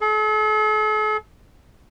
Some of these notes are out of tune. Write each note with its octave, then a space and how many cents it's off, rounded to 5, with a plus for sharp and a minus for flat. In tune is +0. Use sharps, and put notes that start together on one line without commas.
A4 -45